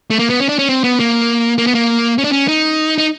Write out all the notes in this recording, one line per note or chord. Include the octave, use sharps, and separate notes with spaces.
A3
A#3
B3
C#4
D4
C#4
C4
B3
A#3
A#3
B3
A#3
C#4
D4
C#4
D#4
D#4